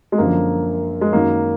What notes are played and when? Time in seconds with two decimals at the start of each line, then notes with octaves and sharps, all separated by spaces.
0.12 G#3
0.18 F#2 D3 F3 A#3
1.01 G#3
1.13 F#2 D#3 F#3 A#3